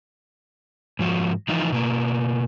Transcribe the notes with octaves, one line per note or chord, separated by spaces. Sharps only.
G#2 F3 F#4
E3 F3 D#4 F4
B2 A#3